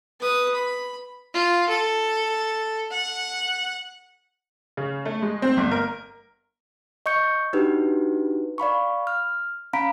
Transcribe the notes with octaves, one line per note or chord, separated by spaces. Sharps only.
B4 D#6
B5
F4
A4
F#5
C#3
A3
G#3
C4
G1
A#4
D#5 C#6 G6 C#7
D4 D#4 F#4 G4 B4
D5 F5 B5 C#6
F6
C#4 F5 A#5 B5 B6 D7